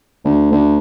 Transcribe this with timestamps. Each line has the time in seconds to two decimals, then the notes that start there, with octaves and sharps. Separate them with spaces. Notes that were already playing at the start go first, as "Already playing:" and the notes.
0.24 D2
0.51 D2